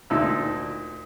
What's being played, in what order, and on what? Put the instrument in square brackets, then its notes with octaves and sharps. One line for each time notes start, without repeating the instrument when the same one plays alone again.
[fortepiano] D2 A#2 D#4 A5 E6